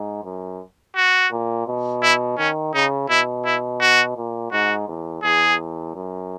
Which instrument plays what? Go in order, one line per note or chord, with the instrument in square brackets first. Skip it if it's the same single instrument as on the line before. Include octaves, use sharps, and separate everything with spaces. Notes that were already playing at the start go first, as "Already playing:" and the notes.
Already playing: [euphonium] G#2
F#2
[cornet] F#4
[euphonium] A#2
B2
[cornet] E4
[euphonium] D#3 [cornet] C#4
[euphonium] C#3 [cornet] D#4
[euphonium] B2 [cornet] E4
[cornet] E4
F#4
[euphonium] A#2
[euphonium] G#2 [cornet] F#4
[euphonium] E2
[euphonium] E2 [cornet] G#4
[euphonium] F#2